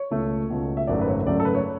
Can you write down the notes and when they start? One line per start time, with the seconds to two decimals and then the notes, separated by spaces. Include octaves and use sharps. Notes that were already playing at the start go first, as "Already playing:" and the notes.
Already playing: C#5
0.11 C#2 B2 A3
0.50 C#2 B2 A3
0.77 E5
0.87 G#1 F#2 C#3 F#3 A3 D5
1.01 B4
1.08 C#5
1.26 G#1 F#2 C#3 F#3 A3 D5
1.40 A4
1.45 B4
1.55 C#5